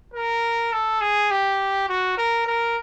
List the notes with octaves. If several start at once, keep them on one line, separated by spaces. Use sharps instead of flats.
A#4
A4
G#4
G4
F#4
A#4
A#4